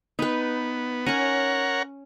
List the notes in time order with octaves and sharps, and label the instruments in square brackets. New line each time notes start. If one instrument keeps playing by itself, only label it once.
[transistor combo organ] B3 [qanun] D#4 B4
[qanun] C#4 C#6 [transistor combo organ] A#4 C#5 F#5